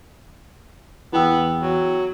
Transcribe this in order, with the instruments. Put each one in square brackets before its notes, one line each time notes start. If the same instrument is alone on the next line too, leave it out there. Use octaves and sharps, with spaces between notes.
[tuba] E2 [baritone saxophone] B3 [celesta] E4 G5 E6
[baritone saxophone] F#3